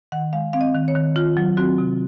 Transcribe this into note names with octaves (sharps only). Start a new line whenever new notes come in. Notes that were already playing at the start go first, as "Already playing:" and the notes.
D#3 F#5
G#3 F5
C4 F5
D#5
D#3
C#5
D#3
D#3 F4
F#3
C4 F#4
C3